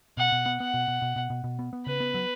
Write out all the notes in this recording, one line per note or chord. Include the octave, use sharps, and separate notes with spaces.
B2 F#5
B2
B3
B3 F#5
B2
B2
B2
B2
B2
B2
B3
B3
C#3 B4
B3
F#3